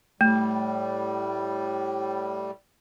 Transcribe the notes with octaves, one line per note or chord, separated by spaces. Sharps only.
A2 G3 A3